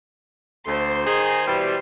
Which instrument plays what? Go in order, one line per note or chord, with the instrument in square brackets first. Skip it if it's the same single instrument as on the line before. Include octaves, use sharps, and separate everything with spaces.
[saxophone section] D2 [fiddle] C5 C6
[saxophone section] D#3 D#4 G#4
B2 E3 G3